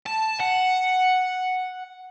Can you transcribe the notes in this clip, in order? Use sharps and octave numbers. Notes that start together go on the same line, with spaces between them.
A5
F#5